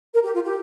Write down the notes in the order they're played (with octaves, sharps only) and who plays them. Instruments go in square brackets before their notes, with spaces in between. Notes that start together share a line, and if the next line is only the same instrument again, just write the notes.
[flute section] A#4
G4
F4
G4